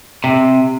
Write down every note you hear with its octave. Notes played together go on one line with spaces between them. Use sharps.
C3